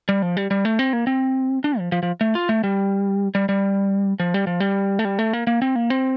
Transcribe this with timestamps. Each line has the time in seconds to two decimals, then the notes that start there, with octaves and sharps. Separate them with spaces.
0.09 G3
0.22 F3
0.37 G3
0.51 G3
0.65 A3
0.79 C4
0.93 A#3
1.07 C4
1.64 D4
1.79 F3
1.92 F3
2.03 F3
2.21 A3
2.35 F4
2.49 A3
2.64 G3
3.35 G3
3.49 G3
4.20 F3
4.34 G3
4.47 F3
4.60 G3
4.99 A3
5.05 G3
5.19 A3
5.33 A#3
5.47 A#3
5.62 C4
5.76 A#3
5.90 C4